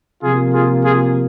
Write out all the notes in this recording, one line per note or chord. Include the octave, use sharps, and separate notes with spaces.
C3 F3 A#3 F4 G#4
F4 G#4
F4 G#4